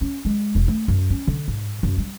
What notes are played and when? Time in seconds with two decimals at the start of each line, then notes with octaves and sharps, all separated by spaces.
0.01 C#4
0.25 G#3
0.55 E1
0.68 A3
0.88 F#2
1.10 C#4
1.27 D3
1.48 G#2
1.83 F#2
1.98 G3